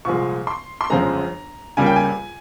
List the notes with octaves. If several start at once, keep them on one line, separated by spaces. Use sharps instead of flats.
C2 A#2 F3 G#3 C#6
C6
C6
G1 F2 C#3 F3 G#3 A#5
C#2 C#3 G3 A#3 G#5
G5
G#5